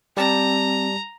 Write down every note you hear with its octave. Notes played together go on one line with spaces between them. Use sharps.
G3 C4 G4 A5 A#5